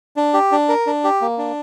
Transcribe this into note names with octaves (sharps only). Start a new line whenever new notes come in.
D4
G4
D4
A#4
D4
G4
A#3
D4